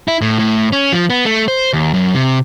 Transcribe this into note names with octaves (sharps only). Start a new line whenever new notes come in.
E4
A2
A2
C#4
F3
B3
A3
C5
D#2
F#2
C3